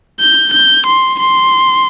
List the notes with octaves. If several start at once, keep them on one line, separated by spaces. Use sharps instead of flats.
G6
G6
C6
C6